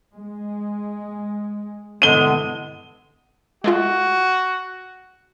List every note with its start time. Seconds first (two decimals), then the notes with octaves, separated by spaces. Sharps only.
0.14 G#3
2.02 G2 B2 D3 E3 G#3 B3 D#7 G7
3.64 G#3 A3 F4 F#4